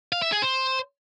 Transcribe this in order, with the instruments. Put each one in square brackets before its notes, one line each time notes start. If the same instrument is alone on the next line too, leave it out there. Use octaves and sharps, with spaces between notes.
[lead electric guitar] F5
E5
G#4
C5